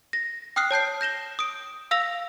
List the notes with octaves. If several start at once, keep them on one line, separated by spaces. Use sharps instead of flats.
A#6
G5 D#6 F6 F#6 C7
C#5 A5 G6 C7
G6 A#6 E7 G7
D#6 D7
F5 E6 A#6 F7